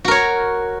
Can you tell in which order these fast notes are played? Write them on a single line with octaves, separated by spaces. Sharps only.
F#4 A#4 C#5